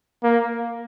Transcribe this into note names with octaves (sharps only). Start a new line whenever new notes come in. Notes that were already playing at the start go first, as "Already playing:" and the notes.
A#3